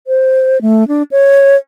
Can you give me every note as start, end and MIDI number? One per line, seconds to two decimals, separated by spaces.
0.07 0.61 72
0.62 0.87 57
0.88 1.03 62
1.11 1.56 73